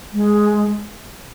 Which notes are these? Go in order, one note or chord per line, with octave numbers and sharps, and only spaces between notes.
G#3